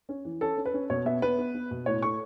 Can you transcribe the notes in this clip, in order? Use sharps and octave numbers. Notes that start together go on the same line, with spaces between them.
C#4
E3
C#4 A4
C#4
B4
C#4
B2 C#5
B3 E5
B3 B4
B3
B3
B2
A2 C#5
A3 C#6